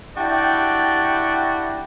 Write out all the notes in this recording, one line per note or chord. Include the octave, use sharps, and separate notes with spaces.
D4 E4 F#4 G4 D5 G5